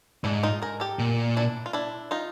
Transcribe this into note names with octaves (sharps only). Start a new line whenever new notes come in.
G#2 D4 E4
D#4 F4
G#4 A#4
G4 A4
A#2
D4 E4
F4
D4 E4
D#4 F4